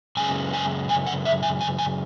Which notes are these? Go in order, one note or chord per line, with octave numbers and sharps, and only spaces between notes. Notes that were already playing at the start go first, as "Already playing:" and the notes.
F#2 C#3 G#3 G#5
G#5
G#5
F#5
E5
G#5
G#5
G#5